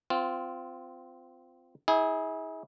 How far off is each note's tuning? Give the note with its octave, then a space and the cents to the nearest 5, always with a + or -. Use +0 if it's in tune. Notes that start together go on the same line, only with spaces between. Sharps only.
C4 -20 F4 +0
E4 -40 G#4 +0